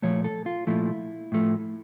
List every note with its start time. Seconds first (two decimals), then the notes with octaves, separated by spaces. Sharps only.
0.02 A#2 F3 A3 C#5
0.24 A4
0.46 F4
0.67 A#2 F3 A3 E4
1.32 A2 F3 A3